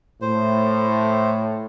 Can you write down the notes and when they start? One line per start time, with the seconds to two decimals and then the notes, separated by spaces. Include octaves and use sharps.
0.22 A2 C5